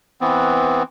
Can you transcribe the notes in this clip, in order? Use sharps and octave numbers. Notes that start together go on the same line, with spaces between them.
E3 B3 C4